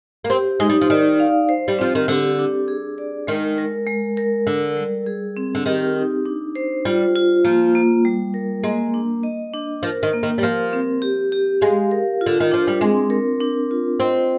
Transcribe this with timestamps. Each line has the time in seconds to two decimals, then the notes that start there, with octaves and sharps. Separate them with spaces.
0.24 A#3
0.30 C4 G4
0.60 G#3 D#4
0.69 G3
0.81 F3
0.90 D#3 D5
1.20 F5
1.49 C5
1.68 G3
1.79 F3 C4
1.95 D#3
2.08 D3 G4
2.39 D4
2.68 G#4
2.98 D5
3.27 D#3 G#3
3.58 A#4
3.87 G#3
4.17 A#4
4.47 D3 A#4
4.77 G3
5.07 G#4
5.37 C4
5.55 D3
5.66 D#3 G4
5.96 D#4
6.26 D4
6.55 C5
6.85 G3 F4
7.16 F4
7.45 F3 A#3
7.75 A#3
8.05 G3
8.34 A#4
8.64 G#3 A#3
8.94 D4
9.23 D#5
9.54 D4
9.83 F3 A#4
10.03 D#3
10.13 A#3
10.23 D#3
10.38 G3
10.43 F3 A#4
10.73 C4
11.02 G4
11.32 G4
11.61 G#3 F5
11.92 A#4
12.21 F4
12.26 D3
12.40 D#3
12.52 F3 D4
12.67 G3
12.81 G#3 C4
13.10 A#4
13.40 D4
13.71 F4
14.00 C4 D#5